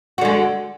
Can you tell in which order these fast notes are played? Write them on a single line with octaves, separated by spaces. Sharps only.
F#4 D3 G#3